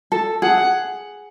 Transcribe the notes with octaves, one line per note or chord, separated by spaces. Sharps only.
A4
G#4 F#5